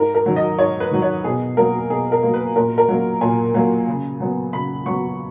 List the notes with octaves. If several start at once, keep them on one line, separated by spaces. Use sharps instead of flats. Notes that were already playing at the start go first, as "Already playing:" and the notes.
Already playing: G#2 A#4
A#4
D#3 F#3
D#5
G#2 C#5
B4
D#3 F#3
C#5
B2 G#4
F#3 A#3 A#4
B2 G#4
A#4
F#3 A#3
B4
A#2 A#4
A#4
F#3 A#3
A#2 G#5
F#3 A#3
C#3
F#3 B3
C#3 B5
F#3 B3 C#6